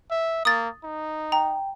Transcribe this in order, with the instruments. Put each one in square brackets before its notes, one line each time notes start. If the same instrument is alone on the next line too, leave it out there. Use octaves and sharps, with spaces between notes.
[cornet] E5
[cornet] A#3 [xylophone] D#6 A6
[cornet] D#4
[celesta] G5 [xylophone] A#5